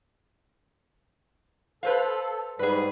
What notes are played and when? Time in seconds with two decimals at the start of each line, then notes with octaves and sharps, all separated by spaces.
1.83 A4 B4 C5 F5
2.59 G#2 G3 G#4 B4